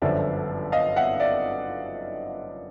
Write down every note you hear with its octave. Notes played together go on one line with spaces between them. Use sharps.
G1 F#2 D3 F3 D5 E5
D#5 F5
E5 F#5
D5 E5